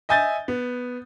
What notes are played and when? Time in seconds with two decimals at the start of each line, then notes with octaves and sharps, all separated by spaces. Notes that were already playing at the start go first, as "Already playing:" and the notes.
0.09 D#5 E5 G#5 G6 A6
0.48 B3